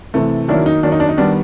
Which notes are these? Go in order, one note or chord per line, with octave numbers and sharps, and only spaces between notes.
C3 E3 A3
D#3 F#3 A#3 D4 E4
D#4
D#3 F#3 A#3 D4
D#4
D4
D#4
D#3 G3 B3 D4